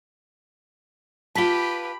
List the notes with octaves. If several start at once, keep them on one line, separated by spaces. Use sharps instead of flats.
F4 G4 B4 A5 B5 B6 G7